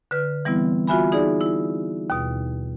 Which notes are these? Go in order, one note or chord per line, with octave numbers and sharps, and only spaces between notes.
D3 B4 F6
E3 G3 B3 C4 E4
F4 F#4 E5 G#5 B5
D#4 G#4 D5
E4
D#2 B2